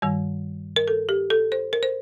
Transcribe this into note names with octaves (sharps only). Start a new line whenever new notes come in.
G2 D#3 G3
A#4
A4
G4
A4
C5
A#4
C5